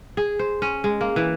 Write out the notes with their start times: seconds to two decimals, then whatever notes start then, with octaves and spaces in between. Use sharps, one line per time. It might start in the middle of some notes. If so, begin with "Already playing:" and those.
0.17 G#4
0.39 C5
0.62 C#4
0.84 G#3
1.01 A#3
1.16 E3